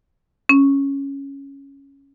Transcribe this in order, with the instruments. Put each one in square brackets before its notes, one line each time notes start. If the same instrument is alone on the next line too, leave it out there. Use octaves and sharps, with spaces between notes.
[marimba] C#4